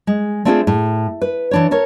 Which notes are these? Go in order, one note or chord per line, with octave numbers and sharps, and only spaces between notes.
G#3
A3 C4 D4 F4 F#4 G#4
A2
B4
E3 D4 C#5
A4 A#4 C#5